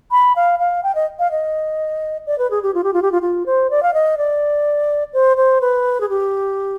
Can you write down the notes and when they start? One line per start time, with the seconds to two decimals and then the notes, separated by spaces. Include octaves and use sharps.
0.11 B5
0.36 F5
0.59 F5
0.84 G5
0.95 D#5
1.19 F5
1.31 D#5
2.27 D5
2.39 B4
2.51 G#4
2.63 G4
2.74 F4
2.84 G4
2.94 F4
3.02 G4
3.12 F4
3.22 F4
3.46 C5
3.71 D5
3.83 F5
3.94 D#5
4.18 D5
5.13 C5
5.37 C5
5.61 B4
6.01 G#4
6.09 G4